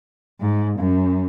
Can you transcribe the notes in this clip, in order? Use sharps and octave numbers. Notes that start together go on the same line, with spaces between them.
G#2
F#2